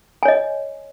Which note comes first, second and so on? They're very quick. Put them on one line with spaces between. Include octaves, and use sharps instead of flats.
G#5 C#5 D#5